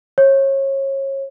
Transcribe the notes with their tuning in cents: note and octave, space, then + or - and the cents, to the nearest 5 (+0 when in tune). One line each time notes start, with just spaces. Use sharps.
C#5 -30